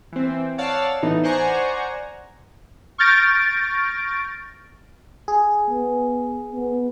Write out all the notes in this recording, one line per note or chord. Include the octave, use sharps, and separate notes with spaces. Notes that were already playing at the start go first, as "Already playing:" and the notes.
E3 C4
C#5 D5 F5 F#5 A5 E6
A2 E3 A3 B3 D#4
C5 D5 F#5 G#5 A#5 C#6
C#6 F6 G6 A6 A#6 D7
G#4
B3
B3